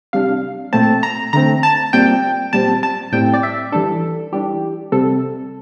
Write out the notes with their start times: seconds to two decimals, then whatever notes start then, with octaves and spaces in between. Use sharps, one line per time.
0.13 C3 G3 D4 F5
0.73 A#2 A3 C4 A5
1.03 A#5
1.33 D3 A3 C4 A#5
1.63 A5
1.93 A#2 G3 C4 G5
2.53 A#2 G3 C4 A5
2.83 A5
3.12 A2 G3 C4 G5
3.34 D5
3.43 E5
3.72 E3 G3 D4 A4
4.32 E3 G3 D4 G4
4.92 C3 G3 C4 A4